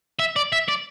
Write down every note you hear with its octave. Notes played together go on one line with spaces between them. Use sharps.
E5
D5
E5
D5